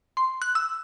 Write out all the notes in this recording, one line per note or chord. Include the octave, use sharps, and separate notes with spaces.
C6
F#6
E6